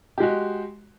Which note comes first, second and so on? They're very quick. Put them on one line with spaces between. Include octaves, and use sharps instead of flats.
G4 G#3 F#4